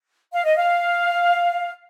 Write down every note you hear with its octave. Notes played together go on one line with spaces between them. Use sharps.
F5
D#5
F5